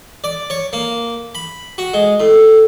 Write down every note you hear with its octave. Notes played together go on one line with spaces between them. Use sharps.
D5
C#5
A#3
B5
F#4
G#3
A2